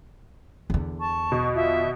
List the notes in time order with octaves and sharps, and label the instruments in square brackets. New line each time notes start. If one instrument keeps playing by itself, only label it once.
[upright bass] E2 D3
[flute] A5 [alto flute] C#6
[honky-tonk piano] B2
[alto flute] F4 [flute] E5